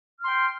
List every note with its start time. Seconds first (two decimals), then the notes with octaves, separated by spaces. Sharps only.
0.21 F6
0.24 C6
0.27 G5